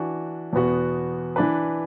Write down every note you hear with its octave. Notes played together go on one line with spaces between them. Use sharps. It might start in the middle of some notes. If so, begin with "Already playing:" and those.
Already playing: E3 D4 F#4
E2 B2 B3 F#4
E3 D4 B4